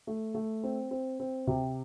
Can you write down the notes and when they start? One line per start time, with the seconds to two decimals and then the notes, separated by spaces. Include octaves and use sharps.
0.07 A3
0.34 A3
0.63 C4
0.91 C4
1.20 C4
1.47 C3